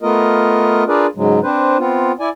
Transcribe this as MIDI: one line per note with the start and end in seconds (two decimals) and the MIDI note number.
0.02 0.84 57
0.02 0.84 59
0.02 0.84 65
0.02 0.84 70
0.02 0.84 75
0.88 1.06 62
0.88 1.06 65
0.88 1.06 68
0.88 1.06 70
0.88 1.06 71
0.88 1.06 74
1.16 1.39 44
1.16 1.39 49
1.16 1.39 54
1.16 1.39 56
1.43 1.77 60
1.43 1.77 62
1.43 1.77 71
1.43 1.77 72
1.79 2.12 59
1.79 2.12 60
1.79 2.12 65
2.20 2.29 64
2.20 2.29 74
2.20 2.29 80